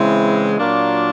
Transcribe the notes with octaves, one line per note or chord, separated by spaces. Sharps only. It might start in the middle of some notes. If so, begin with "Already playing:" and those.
Already playing: C#3 E3 G#3 C4 E4
A#2 F#3 A#3 D4 F4